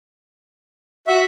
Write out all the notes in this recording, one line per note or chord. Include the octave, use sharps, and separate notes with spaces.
F#4 E5